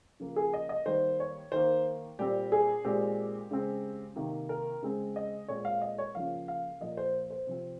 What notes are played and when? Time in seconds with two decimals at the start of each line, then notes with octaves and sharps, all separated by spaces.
0.20 C#3 F3 A#3
0.36 G#4
0.54 D#5
0.69 D#5
0.86 D#3 G3 A#3 C5
1.20 C#5
1.52 D#3 A#3 C5
2.19 A#2 G3 C4 G4
2.52 G#4
2.85 A#2 G#3 C4 G4
3.51 C#3 G#3 C4
4.16 C3 D#3 A#3
4.49 A#4
4.83 C#3 G#3 C4
5.16 D#5
5.48 A#2 G#3 C4 C#5
5.65 F5
5.82 D#5
5.98 C#5
6.15 C#3 F3 A#3 F5
6.48 F5
6.80 A#2 F3 A#3 D#5
6.97 C5
7.30 C5
7.47 C3 F3 C4